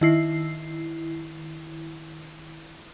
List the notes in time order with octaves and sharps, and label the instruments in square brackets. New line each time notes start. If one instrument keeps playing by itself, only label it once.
[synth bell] D#3 E4 C7